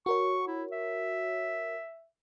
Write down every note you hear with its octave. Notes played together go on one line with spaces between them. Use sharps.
F#4 A#4 C#5 C#6
E4
E5